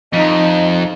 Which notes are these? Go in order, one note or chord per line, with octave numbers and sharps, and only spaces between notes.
F2 D#4